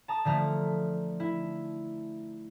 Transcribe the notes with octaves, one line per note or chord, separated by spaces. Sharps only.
A5 A#5 D#6
D3 F3 A3 A#5 F6
E4